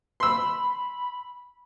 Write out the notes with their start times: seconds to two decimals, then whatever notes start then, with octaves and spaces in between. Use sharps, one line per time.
0.20 B5 C6 E6